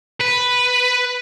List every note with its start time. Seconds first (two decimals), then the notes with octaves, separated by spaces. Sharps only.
0.20 B4